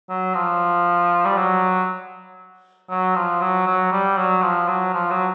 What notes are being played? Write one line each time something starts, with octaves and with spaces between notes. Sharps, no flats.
F#3
F3
G3
F#3
F#3
F3
F#3
F#3
G3
F#3
F3
F#3
F3
F#3